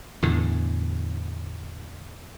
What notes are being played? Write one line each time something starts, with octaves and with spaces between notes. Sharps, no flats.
E2 A2 D3